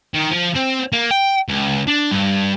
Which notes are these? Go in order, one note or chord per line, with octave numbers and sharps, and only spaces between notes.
D#3
F3
C4
A#3
G5
C#2
D4
G2